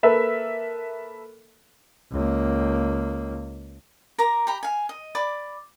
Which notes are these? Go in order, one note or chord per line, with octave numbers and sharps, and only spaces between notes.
A#3 A4 B4 E5
C#2 A#3
A#4 A#5 D6
G4 A#5 B5
F5 G#5
D#5
D5 B5 D6